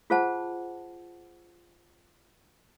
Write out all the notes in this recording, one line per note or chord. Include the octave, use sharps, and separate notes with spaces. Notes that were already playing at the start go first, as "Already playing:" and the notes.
F4 G#4 C5 F#5 A5